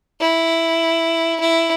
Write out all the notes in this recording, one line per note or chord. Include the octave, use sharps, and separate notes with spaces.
E4
E4